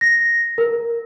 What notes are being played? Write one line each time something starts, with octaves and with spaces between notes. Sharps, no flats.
A#6
A#4